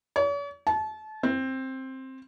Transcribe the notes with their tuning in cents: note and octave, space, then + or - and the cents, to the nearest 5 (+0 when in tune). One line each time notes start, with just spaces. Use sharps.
C#5 +45
A5 -30
C4 +10